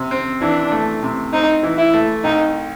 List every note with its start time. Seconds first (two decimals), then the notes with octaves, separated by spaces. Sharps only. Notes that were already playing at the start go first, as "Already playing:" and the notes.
Already playing: C3
0.11 C4
0.42 E3 D4
0.72 A3
1.03 C3
1.33 C4 D#4
1.63 E3
1.78 E4
1.94 A3
2.24 C2 D#4